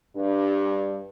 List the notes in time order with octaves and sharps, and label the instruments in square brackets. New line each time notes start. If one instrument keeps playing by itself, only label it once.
[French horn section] G2